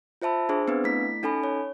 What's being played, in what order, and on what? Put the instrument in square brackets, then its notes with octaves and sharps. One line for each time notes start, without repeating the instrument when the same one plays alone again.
[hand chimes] F4 C5 E5 A5 B5 E6
D4 G#4 C5
B3 C4 D4 B4
A3 E4 B6
C#4 D#4 A4 G#5 B5
C#5